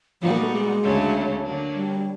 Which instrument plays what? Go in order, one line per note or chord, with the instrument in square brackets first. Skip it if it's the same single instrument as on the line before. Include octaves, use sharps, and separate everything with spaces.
[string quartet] A#2 G3 B3 D#4 F#4 [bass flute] F3
[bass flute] A#3
A3
G#3
[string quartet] D2 C#3 F#3 A3 C#4
D3 F#3 A#3 D4
[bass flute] G3